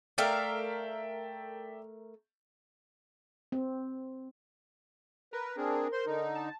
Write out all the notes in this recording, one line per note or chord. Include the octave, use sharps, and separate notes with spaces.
A3 A#4 D5 E5 F5 G5
C4
A#4 B4
C4 D4 G#4
C5 C6
D3 D#4
A5